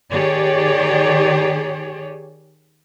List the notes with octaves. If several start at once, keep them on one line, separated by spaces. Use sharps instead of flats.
D#3 G4 G#4 C#5 D5